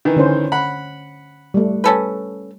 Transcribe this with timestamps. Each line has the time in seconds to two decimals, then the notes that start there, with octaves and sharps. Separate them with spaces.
0.05 D#3 E3
0.16 D3 C#4 C5
0.52 F#5 B5
1.54 G3 A3
1.84 C#4 A4 B4